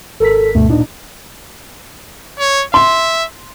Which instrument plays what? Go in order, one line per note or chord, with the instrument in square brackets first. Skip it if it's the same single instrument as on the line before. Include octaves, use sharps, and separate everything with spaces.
[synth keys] G#1 A#4 B6 [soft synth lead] A4
[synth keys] D2 G2 B2 [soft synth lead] A3
[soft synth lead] A#2 [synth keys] D4 D#4
[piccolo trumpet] C#5
[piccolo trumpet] E5 [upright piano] C6